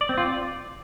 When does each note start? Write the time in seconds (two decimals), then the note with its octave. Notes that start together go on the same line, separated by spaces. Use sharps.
0.01 D5
0.09 C4
0.18 F4
0.26 D5